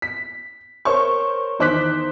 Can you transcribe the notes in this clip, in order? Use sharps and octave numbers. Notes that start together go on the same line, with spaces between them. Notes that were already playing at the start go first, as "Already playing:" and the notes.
B6
A#4 C5 C#5 C#6
E2 D#3 C5 D6 F#6 B6